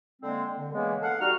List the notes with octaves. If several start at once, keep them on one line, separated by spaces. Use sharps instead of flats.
D3 G#3 A#3 C4
D3
C#3 E3 G#3 A#3 B3
A4 F5 F#5
G3 D#4 F#4 F6